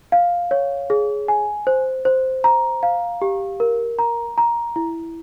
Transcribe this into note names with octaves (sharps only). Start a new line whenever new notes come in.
F5
C#5
G#4
G#5
C5
C5
A#5
F5
G4
A#4
A#5
A#5
E4